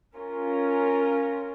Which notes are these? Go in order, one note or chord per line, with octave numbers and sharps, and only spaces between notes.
C#4 F4 A#4